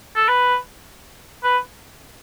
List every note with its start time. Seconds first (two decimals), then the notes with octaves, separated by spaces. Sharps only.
0.16 A4
0.28 B4
1.44 B4